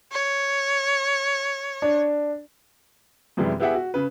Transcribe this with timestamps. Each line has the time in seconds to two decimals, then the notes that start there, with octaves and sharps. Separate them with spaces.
0.12 C#5
1.82 D4
3.37 F#2 C3 E3 G3 G#3
3.60 B3 E4 G4 G#4 E5 F#5
3.75 F#4
3.94 C#3 B4